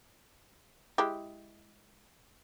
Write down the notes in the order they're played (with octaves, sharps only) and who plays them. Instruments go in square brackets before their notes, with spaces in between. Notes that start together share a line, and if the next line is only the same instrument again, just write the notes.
[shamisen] G#3 E4 G4